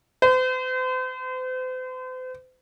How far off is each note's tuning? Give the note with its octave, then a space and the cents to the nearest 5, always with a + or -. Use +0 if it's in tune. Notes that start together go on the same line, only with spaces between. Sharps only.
C5 -40